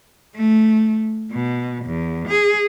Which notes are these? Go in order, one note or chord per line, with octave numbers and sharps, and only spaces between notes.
A3
B2
E2
G#4